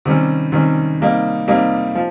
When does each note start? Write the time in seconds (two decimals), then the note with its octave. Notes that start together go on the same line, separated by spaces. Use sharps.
0.05 C3 D#3 G3 C#4
0.52 C3 D#3 G3 C#4
1.00 C3 G3 A#3 D#4
1.48 C3 G3 A#3 D#4
1.95 F3